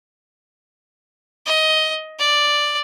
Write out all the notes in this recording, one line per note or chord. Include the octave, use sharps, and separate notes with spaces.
D#5
D5